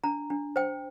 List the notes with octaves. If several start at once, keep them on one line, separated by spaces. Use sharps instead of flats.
D4 A#5
D4
C5 G5